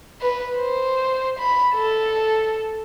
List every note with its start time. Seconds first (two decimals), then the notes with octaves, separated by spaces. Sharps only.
0.21 B4
0.57 C5
1.39 B5
1.75 A4